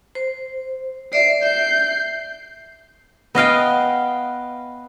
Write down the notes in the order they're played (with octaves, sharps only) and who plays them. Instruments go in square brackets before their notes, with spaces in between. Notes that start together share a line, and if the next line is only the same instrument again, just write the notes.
[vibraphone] C5
[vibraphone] D5 E5 [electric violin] C7 D7
[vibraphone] E5 [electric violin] G6 C7
[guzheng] B3 D#5 F5 G5